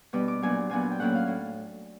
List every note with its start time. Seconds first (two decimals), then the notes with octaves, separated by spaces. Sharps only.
0.13 B2 G3 B3 D4 D6
0.28 D6
0.42 A#2 F#3 B3 D4 G#5
0.70 A#2 F#3 B3 D4 G#5
0.81 G#5
0.91 G5
1.00 A2 F#3 A#3 C#4 E4 F#5
1.14 F5
1.27 A2